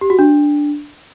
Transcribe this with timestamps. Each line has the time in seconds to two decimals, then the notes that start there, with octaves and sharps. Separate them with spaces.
0.01 G4
0.10 F#4
0.19 D4